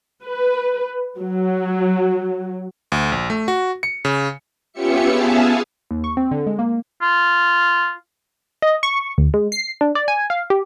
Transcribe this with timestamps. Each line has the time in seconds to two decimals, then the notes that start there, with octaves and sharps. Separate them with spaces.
0.25 B4
1.19 F#3
2.92 D2
3.12 A#1
3.30 A3
3.48 F#4
3.83 C#7
4.05 C#3
4.73 B3 C#4 F4 G4 E5 C#7
5.08 B3 G#4 E5 F5 G#5 A5
5.91 D#2
6.04 C#6
6.17 C4
6.31 D3
6.46 G#3
6.59 A#3
7.02 F4
8.62 D#5
8.83 C#6
9.18 D2
9.34 G#3
9.52 C7
9.81 D4
9.95 D5
10.08 G#5
10.30 F5
10.50 G4